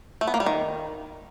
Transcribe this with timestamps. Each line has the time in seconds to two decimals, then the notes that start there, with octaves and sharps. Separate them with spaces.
0.21 A3
0.27 B3
0.34 A#3
0.40 G3
0.46 D#3